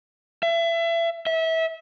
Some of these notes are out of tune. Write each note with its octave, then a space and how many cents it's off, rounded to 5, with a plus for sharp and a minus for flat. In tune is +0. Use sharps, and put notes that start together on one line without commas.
E5 +30
E5 -25